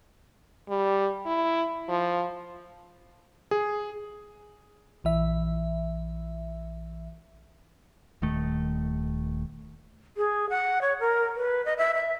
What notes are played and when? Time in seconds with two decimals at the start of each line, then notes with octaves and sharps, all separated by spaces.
0.69 G3
1.27 E4
1.89 F3
3.51 G#4
5.04 A#1 E3 E5
8.22 D#1 D#3 A3
10.17 G#4
10.50 F#5
10.81 C#5
11.00 A#4
11.36 B4
11.65 D#5
11.78 E5
11.95 E5